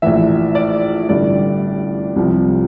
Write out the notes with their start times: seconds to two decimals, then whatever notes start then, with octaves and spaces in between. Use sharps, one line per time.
0.02 A#1 A2 E3 E5
0.55 D5
1.09 A1 G2 D3 D5
2.16 C2 C3 F3